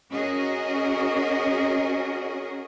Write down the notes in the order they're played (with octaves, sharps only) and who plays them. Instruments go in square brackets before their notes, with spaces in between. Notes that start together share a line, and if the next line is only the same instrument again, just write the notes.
[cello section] C#4 F#4 G#4 A#4 D#5